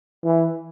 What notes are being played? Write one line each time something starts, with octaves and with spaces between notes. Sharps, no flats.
E3